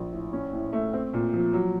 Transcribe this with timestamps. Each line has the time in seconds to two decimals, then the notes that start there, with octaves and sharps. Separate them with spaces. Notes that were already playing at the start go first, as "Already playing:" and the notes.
Already playing: A#1 F3
0.12 A2
0.33 C#4
0.53 A2
0.73 A3
0.93 C4
1.14 A#2
1.34 F3
1.54 F#3